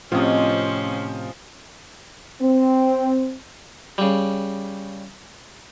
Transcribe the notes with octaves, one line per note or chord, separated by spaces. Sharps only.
A2 C3 F3 C4 C#4 F4 G#4 D#5
C4
C#3 G3